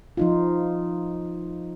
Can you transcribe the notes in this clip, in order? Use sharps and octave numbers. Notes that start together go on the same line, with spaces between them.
F3 D#4 F4